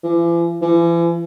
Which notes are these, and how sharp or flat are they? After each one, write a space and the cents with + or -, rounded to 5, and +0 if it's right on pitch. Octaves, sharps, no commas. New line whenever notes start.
E3 +45
E3 +40